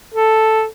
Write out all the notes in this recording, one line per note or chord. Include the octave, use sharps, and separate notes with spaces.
A4